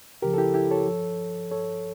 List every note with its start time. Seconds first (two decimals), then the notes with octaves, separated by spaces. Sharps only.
0.22 C#2 C#3 F3 G4 A#4
0.34 A4
0.38 E4 G4
0.54 E4 G4
0.71 A4 C#5
0.87 G2 F3
1.51 G2 F3 A4 C#5